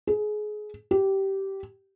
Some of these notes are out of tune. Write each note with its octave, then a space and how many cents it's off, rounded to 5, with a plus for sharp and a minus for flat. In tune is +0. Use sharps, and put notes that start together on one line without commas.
G#4 +25
G4 -15